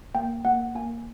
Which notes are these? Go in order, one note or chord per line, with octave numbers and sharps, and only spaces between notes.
A#3 G5
A#3 F#5
A#3 G#5